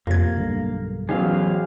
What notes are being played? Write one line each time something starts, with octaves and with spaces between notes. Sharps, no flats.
F2 A2 C3 F3 A#3 G#6
B1 G2 D3
A1 D3 F#3 B3 G#4 C5 F5